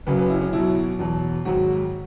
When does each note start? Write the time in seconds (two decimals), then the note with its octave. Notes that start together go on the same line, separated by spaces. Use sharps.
0.06 F#1 F#2 C#3 F#3 B4
0.19 B4
0.30 E4
0.41 C#4
0.53 B1 B2 F#3 E4
0.99 E2 B2 F#3
1.45 G#1 G#2 F#3 F#4